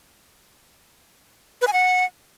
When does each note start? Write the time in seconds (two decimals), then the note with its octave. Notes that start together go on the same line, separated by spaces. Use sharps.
1.61 B4
1.67 G#5
1.73 F#5